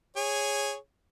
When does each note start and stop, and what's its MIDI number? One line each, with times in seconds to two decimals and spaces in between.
0.17 0.76 68
0.17 0.76 73